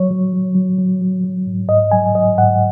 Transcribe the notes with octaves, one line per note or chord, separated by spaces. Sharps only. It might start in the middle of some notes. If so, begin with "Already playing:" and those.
Already playing: F#3 C#5
F#3
F#3
F#3
F#3
F#3
F#3
G#2
G#2 D#5
F#3 G#5
F#3 D#5
G#2 F#5